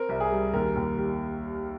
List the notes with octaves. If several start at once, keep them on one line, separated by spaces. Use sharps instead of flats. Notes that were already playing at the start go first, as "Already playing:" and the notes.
Already playing: C4 A#4
C2
G#4
G3
D#2 A#4
D#2
G3